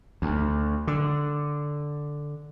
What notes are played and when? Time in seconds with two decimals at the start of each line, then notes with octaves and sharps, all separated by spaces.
0.22 D2
0.87 D3